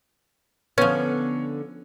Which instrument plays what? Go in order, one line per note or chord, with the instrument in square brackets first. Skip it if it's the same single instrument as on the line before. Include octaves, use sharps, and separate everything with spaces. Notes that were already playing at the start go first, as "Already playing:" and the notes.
[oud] D3 B3 [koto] F3 C#4 [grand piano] C#5